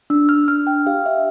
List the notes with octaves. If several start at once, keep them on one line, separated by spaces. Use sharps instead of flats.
D4 E6
F6
D4 F6
G5
G4 F5
E5